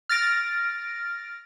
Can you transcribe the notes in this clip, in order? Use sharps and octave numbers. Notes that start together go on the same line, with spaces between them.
F6 A6 A#6 D7